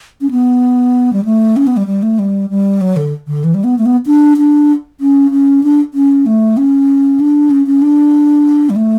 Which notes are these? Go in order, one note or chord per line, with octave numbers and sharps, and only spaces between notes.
C#4
B3
G3
A3
C#4
B3
G3
G3
A3
G3
G3
F#3
D3
D3
E3
G3
B3
A3
B3
D4
D4
C#4
C#4
D4
C#4
A3
C#4
D4
C#4
C#4
D4
G3
A3